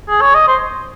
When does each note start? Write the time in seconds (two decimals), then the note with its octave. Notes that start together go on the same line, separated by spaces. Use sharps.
0.09 G#4
0.21 C#5
0.35 D#5
0.48 C5